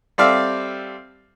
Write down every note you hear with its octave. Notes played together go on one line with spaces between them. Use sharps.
G3 C4 A4 D5 E5 F5